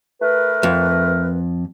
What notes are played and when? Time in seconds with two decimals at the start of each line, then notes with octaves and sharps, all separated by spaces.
0.22 A3 A#4 B4
0.63 F2